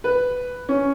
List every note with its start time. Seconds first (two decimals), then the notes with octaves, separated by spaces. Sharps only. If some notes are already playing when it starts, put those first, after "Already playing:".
0.04 B4
0.69 C#4